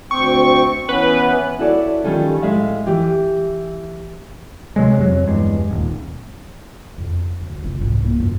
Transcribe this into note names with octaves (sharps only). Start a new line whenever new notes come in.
D2 C4 G5 C#6
E3 B3 C#4 B4
E4 F#4 A4 C#5 D5
D#3 G3 C#4 F4 A4
A2 G#3 E5 F5
E3 G4
C3 F#3 G#3
F2 F#3
E2 G2 G#3
D#1
F2
D2
F1 F4
C2 G#2
A#3 B3
F#2